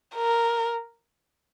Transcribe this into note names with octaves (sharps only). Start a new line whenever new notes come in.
A#4